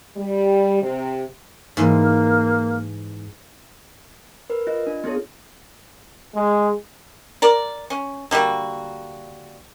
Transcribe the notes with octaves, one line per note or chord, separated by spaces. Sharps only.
G3
C3
G#2 E3 A#3 C6
A#4 B4
F4 D#5
D4
B3 F4 G#4 A4 C#5
G#3
A#4 D5
C#4
D3 G3 A#3 F#4